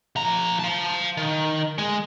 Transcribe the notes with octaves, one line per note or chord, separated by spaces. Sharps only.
F3 A#5
F5 A5
D#3
G#3 G#4